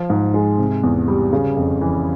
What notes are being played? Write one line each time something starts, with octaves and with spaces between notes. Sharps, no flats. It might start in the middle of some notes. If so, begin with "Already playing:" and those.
Already playing: F3
G#2
G#3
C3
E2
G3
C#3
F2
E3